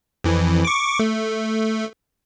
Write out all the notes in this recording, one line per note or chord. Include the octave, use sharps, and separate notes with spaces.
F2 E3
C#6 D6
A3